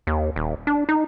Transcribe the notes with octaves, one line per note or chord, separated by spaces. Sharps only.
D#2
D#1
D4
D#4